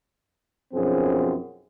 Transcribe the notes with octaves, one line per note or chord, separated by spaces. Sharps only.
B1 F#2 F3 C4 C#4 G#4